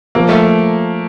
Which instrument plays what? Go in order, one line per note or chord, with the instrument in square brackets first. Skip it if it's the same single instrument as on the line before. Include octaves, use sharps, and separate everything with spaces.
[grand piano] F3 [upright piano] A#3
[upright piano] A3